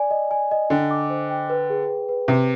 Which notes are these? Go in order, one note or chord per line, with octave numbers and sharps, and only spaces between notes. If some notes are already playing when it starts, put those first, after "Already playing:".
Already playing: D5 G#5
D#5
G#5
D#5
D3 G5
D6
C5
G5
B4
G#4
B4
B4
C3 B4